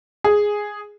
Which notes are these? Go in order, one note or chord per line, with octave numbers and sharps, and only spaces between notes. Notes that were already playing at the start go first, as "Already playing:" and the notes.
G#4